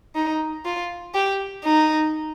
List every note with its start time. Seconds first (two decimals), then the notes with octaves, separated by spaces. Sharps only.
0.15 D#4
0.65 F4
1.14 G4
1.64 D#4